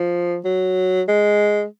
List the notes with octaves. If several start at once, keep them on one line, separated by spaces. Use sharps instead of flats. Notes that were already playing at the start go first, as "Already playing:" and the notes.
Already playing: F3
F#3
G#3